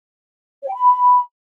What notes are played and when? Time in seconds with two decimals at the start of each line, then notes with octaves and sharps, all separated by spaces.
0.63 C#5
0.68 G5
0.73 B5